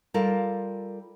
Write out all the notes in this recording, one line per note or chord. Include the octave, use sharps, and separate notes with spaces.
G3 F4 A4 A#4